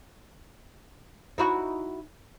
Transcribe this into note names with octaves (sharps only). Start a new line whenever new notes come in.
D#4 E4 F#4